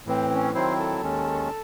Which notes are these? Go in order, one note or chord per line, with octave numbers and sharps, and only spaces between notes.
A2 E3 C4 C5
C#4 C#5
D#3 F#3 C4 E4 C5 C6
A4 A5
D#2 D#3 G#3 C#4